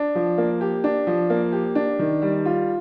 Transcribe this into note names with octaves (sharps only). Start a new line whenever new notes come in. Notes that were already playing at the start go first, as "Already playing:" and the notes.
Already playing: D4
F3
A#3
G4
D4
F3
A#3
G4
D4
D#3
G3
F4